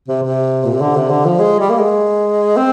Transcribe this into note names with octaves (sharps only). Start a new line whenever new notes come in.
C3
C3
A#2
C3
D3
C3
D3
F3
G#3
G3
A#3
G#3
C4